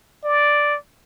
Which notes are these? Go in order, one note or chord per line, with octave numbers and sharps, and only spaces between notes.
D5